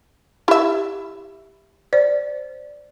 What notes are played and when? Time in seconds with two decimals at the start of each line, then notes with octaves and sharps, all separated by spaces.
0.48 E4 G4 E5
1.93 C5 D5